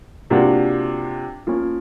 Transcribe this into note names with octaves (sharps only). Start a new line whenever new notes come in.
C3 F3 A#3 D4 F#4
F3 A#3 C#4